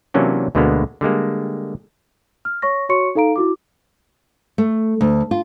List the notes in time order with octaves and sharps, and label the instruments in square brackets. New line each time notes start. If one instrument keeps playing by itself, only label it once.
[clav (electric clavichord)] C3 E3 F#3 A#3 C#4 D4
D2 B2 D3 G#3 A#3 B3
D3 G3 G#3 A#3
[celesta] F6
C#5 C#6 A#6
F#4 C#5 C6 C#6 C#7
D#4 A4 F5 A#5 D7
E4 F#4 D6
[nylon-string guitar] A3
D2
F4